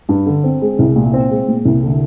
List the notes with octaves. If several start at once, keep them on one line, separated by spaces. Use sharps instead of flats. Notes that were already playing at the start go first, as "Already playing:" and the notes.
G2
D3
C4
G#3
C2
A#2
C4
G#3
A#2
C2
D3